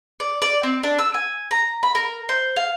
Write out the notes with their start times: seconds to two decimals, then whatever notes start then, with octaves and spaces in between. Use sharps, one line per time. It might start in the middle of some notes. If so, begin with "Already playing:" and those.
0.20 D5
0.42 D5
0.63 C4
0.83 D4
0.99 E6
1.14 G#5
1.51 A#5
1.83 B5
1.95 A#4
2.29 C5
2.56 F5